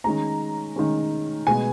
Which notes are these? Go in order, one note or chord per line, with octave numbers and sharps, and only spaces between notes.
D#3 G#3 C#4 A#5
D#3 G#3 C#4
B2 G#3 B3 G#5